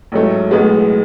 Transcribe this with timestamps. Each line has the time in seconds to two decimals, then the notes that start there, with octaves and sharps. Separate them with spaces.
0.12 A1 G#2 F#3 A3
0.51 B1 A2 G#3 B3